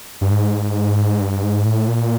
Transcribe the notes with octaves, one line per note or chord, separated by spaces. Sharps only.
G2
G#2
G2
G#2
A2
A#2